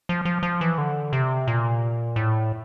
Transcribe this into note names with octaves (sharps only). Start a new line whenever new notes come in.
F3
F3
F3
E3
D3
C3
A#2
A2